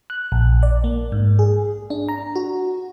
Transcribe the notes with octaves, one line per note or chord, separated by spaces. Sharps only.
F#6
A#1
D5
A#3
G#2
G#4
D4
A#5
F#4